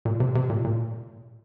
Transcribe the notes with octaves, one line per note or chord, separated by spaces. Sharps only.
A#2
C3
C3
A#2
A#2